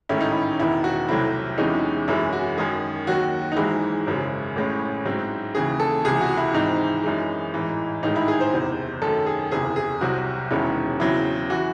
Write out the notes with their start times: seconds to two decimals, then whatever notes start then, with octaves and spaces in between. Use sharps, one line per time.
0.09 A1 G#2 D#3 A3 C#4 E4
0.20 D#4
0.32 E4
0.59 E1 E2 D#3 E4
0.84 F#4
1.09 C2 C3 F#3 A3 C4 E4
1.58 E2 C3 E3 G#3 C#4 D#4
2.08 F#2 E3 G#3 C#4 E4
2.33 F#4
2.58 F#2 D#3 G#3 C#4 G#4
3.07 D#2 D#3 F#3 F#4
3.52 D#4
3.56 G#1 G#2 E3 G#3 E4
4.07 G#1 F#2 C#3 G#3
4.56 A1 A2 G#3 C#4
5.05 G#2 F#3 C4
5.55 D#2 C#3 E3 G#4
5.80 A4
6.05 C#2 C3 E3 G#4
6.21 F#4
6.37 E4
6.54 G#1 G#2 E3 C4 D#4
7.04 F#2 E3 G#3
7.54 A1 G#2 E3
8.03 A1 G#2 D#3 G#3 D#4
8.16 E4
8.28 G#4
8.40 C5
8.53 F#1 E2 C3
9.02 F#2 D#3 A3 A4
9.26 G#4
9.51 F#1 E2 C3 G#4
9.76 G#4
10.01 C2 C3 F#3 C4 F#4
10.50 E1 E2 D#3 G#3 C#4 E4
11.00 E2 C#3 F#3 C4 E4
11.50 E3 F#4